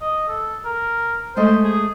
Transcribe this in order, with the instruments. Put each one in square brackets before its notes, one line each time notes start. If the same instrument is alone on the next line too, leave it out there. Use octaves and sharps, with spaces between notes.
[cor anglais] D#5
A4
A#4
[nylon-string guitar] G#3 A3 D#5 [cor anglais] C5
[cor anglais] G#4